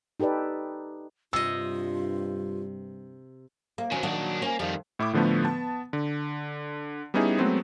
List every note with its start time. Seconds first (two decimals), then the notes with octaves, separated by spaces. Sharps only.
0.20 D#4 G4 A4 B4 D5
1.33 G2 C3 F4 D#5 E6
3.78 A#3
3.92 D#3 F#3 C#4
4.03 A#2 D#3 F#3 D4 F#4
4.42 A#3 C#4
4.60 F2 D#3 G3
4.99 A2 E4 E5 D6
5.13 A2 D3 F3 A3 B3
5.44 B3 A5
5.93 D3
7.14 G3 B3 C#4 D#4 E4 G#4
7.39 F#3 G#3 A3 B3 C4